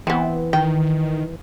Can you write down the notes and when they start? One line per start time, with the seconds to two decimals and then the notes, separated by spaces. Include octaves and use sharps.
0.07 E3 B3 C4
0.53 D#3 G5